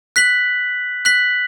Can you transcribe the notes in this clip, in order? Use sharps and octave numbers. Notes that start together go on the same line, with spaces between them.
F#6 B6 F#7
F#6 B6 F#7